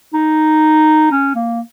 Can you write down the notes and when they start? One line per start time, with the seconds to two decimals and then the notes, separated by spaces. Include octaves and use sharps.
0.14 D#4
1.12 C#4
1.35 A#3